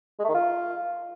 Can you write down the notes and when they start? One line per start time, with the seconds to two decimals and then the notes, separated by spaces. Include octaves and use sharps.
0.19 G#3
0.24 A3
0.29 D#3
0.34 F4